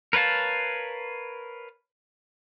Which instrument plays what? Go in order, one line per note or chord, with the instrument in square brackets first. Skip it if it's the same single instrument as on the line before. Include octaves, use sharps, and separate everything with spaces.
[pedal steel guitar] A#4 B4 C#5 F5 A5